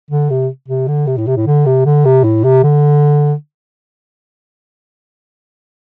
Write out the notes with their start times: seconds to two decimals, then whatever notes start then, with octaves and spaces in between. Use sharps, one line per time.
0.10 D3
0.30 C3
0.68 C3
0.88 D3
1.07 C3
1.17 A2
1.27 C3
1.36 A2
1.46 D3
1.66 C3
1.85 D3
2.05 C3
2.24 A2
2.44 C3
2.63 D3